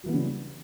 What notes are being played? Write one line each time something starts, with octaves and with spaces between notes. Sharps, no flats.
C#3 E3 F#3 G3 B3